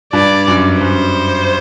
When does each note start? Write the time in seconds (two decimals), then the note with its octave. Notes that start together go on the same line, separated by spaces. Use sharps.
0.13 G2 D5
0.48 F#2
0.81 F#2 C5